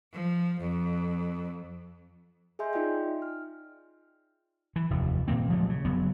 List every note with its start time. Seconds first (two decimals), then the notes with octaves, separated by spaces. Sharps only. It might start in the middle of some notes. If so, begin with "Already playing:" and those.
0.13 F3
0.60 F2
2.59 G#4 D#5 E5 G#5 C6 G6
2.73 D#4 F4 D5 D#5 G5
3.22 F6
4.76 E3
4.90 F1 D#2
5.28 A#2 D#3 A#3 C4
5.50 F3 F#3 G#3 A3
5.69 C#3
5.85 F#1 F#3 B3